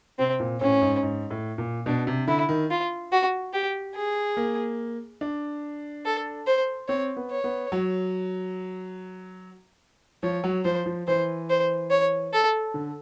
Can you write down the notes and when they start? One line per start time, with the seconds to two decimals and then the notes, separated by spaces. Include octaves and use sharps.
0.19 C3 C4
0.40 A#2
0.60 A2 C#4
0.81 G#2
1.03 G#2
1.31 A2
1.58 A#2
1.86 B2 D4
2.07 C3
2.27 D3 E4
2.49 D#3
2.70 F4
3.12 F#4
3.53 G4
3.95 G#4
4.37 A#3
5.21 D4
6.05 A4
6.47 C5
6.88 C4 C#5
7.17 B3
7.31 C#5
7.44 B3
7.72 F#3
10.23 F3 C#5
10.44 F#3
10.65 F3 C5
10.86 F3
11.08 E3 C5
11.49 C5
11.90 C#5
12.33 A4
12.74 D3